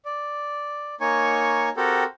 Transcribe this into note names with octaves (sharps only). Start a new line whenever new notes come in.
D5
A#3 D#4 C#5 G#5 C#6
C4 F#4 G4 A4 A#4